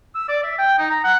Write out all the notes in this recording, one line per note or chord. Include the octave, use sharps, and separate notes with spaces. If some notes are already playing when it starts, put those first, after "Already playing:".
E6
D5
E5
G5
D#4
A#5
F#5